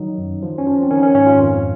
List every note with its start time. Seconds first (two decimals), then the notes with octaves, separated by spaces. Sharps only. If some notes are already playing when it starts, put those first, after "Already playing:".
Already playing: D#3 F#3 D#4
0.18 F#2
0.42 F3
0.58 C#4
0.66 F3
0.83 C4
0.91 D#3 C#4
1.03 C#4
1.14 G#2 C#4
1.27 F4
1.38 F2